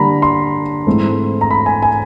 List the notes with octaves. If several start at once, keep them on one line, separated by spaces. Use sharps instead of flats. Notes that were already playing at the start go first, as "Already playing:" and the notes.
Already playing: D3 G3 A#3 D4 A#5 B5
C6
G#2 E3 A3 C4
A#5
B5
G#5
G#5